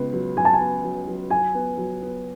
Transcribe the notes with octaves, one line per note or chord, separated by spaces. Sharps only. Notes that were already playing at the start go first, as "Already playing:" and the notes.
Already playing: C#2 C#3 B3
F#3
F#3 G#5
A5
G#5
B3
F#3
F#3
F#3 G#5
B3
F#3
B3